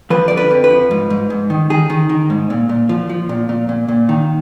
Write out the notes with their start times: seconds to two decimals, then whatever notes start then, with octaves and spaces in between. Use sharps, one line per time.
0.10 F3 B4
0.28 D3 D5
0.37 B4
0.51 F2
0.64 B4
0.70 F3
0.91 G#2
1.10 G#2
1.30 G#2
1.50 D#3
1.70 D#3 G#4
1.90 D#3
2.09 D#3
2.30 G#2
2.50 A#2
2.69 A#2
2.89 F3
3.09 F3
3.29 A#2
3.49 A#2
3.69 A#2
3.88 A#2
4.09 D#3